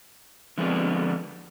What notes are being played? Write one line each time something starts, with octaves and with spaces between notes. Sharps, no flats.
D3 F3 G#3 B3 C4 D4